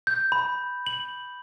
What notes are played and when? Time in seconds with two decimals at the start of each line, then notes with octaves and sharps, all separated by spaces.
0.07 G6
0.32 B5
0.86 F#7